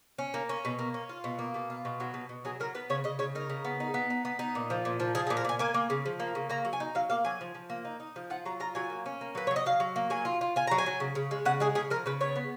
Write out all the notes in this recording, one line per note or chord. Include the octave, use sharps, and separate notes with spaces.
C#4
A#3
C#4
B2
A#3
C#4
F4
B2
A#3
B2
F4
B2
F#3
B2
B2
F#3 G#4
F#3 A#4
B3 B4
C#3 C#5
C#3 D#5
C#3 C#5
D#4 A#4
C#3
B3
D#4
B3
D#4
B3
D#4
A#2
F3
A#2
F3
F3 G#4
G#4
A#2
A#4
A#2 G#5
A#3 G#5
A#3
C#3
F3
A#3
C#3
A#3 A#5
F#3
G#5
D#4
F#3 F5
A#3 F5
F#3 G#5
F3
F3
A#3
D#4
D#4
F3
F4 F#5
F#3 A#5
F4 A#5
F#3 G#5
A#3
C#4
A#3
F#3 B4
C#5
F#3
D#5
F#3 F5
F#3
A#3
F#3 G#5
F4
F4
F4 G#5
F#3 A#5
G#5
F#3
C#3
C#3
G#3
C#3 F#5
G#3 G#4
C#3 G#4
F3 A#4
C#3 B4
B3 C#5
B3